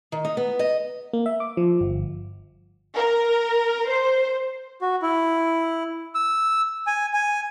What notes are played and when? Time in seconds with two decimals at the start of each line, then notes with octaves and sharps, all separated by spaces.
0.12 D#3
0.25 D#4
0.37 B3
0.59 D#5
1.13 A#3
1.26 E5
1.40 D6
1.57 F3
1.81 G1
2.96 A#4
3.90 C5
4.82 F#4
5.02 E4
6.15 E6
6.87 G#5
7.14 G#5